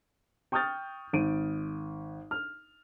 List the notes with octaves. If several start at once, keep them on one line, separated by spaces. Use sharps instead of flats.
G5 C#6 D#6 F6 G6 A6
G#1 D7 D#7
F6